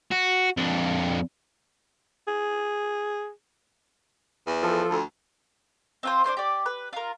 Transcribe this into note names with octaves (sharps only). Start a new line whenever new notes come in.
F#4
F2 D4
G#4
E2
F3 A4
D2
C4 F4 C5
D4 F4 C5 C6
G4 D5
B4
F4 A#4